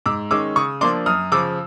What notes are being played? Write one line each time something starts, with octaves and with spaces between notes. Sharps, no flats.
G#2 D6 E6
D#3 G#3 C#4 D6 E6
C#3 C#6 D#6
F3 A#3 D4 C6 D6
F#2 D#6 F6
C#3 F3 D6 E6